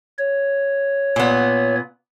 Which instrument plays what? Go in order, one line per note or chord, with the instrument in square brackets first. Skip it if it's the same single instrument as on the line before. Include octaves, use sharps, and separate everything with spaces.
[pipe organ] C#5
[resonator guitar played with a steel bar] A#2 B3